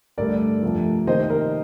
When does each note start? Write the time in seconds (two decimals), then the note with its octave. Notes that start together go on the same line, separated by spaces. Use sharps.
0.18 G2 D3 A3 A#4 D5
0.63 F2 C3 F3 A3
1.07 C3 D#3 A#3 C5 D#5
1.30 A#4